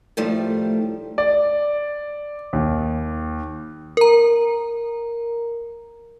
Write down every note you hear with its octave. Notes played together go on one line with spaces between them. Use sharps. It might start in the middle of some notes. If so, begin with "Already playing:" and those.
A2 D#3 F3 G3 A3
D5
D#2
A#4 A#5